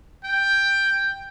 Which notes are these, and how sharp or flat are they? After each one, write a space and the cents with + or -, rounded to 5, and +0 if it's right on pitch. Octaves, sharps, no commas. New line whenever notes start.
G5 +5